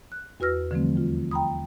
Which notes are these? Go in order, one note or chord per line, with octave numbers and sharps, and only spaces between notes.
F#6
E2 F#4 B4 E6 F6 A#6
D3 E3 F3 G3 A3 C4
D#2 F4
G5 A#5 B5 D#6